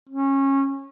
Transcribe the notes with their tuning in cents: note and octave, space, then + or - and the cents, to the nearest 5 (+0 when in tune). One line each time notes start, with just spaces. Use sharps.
C#4 -20